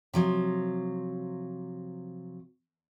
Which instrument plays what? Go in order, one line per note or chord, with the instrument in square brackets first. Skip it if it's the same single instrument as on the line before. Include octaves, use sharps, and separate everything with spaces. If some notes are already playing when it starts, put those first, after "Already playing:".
[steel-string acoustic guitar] C3 F3 F#3